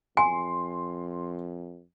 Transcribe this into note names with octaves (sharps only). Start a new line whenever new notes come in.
F2 G#5 C6